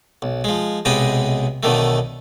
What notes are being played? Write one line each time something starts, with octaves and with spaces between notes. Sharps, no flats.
B1
F3 G#3
B1 C3 G#3 B3 D#5 G5
B1 B2 D3 D#3 A3